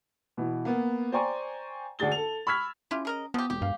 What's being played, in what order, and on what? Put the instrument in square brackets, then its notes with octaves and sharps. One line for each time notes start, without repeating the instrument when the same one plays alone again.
[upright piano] B2 E3
A#3 B3
C5 D5 G5 G#5 A#5 C#6
D2 D4 G#4 A6 G7
A4 F7
B5 C#6 E6 F6 G#6 B6
[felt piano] C#4 [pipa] E4 F4 G4
[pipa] G#4 A#4 D#5
[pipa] F3 G4 [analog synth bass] B3 [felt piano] D#6
[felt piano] E1 [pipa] G4
[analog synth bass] G2 [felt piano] F5